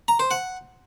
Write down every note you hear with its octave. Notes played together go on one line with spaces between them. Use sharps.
A#5
C5
F#5